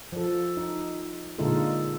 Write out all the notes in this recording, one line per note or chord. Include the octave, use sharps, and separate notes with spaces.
F3 A4
D#4
A#2 D3 G#3 D#4 F4 A4